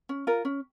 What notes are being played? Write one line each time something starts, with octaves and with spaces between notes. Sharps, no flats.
C#4
F4 A#4
C#4